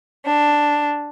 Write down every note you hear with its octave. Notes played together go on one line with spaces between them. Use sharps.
D4